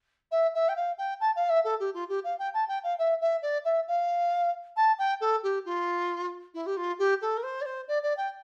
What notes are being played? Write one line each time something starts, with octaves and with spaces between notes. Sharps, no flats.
E5
E5
G5
F5
G5
A5
F5
E5
A4
G4
F4
G4
F5
G5
A5
G5
F5
E5
E5
D5
E5
F5
A5
G5
A4
G4
F4
E4
G4
F4
G4
A4
A#4
C5
D5
C5
D5
D5
G5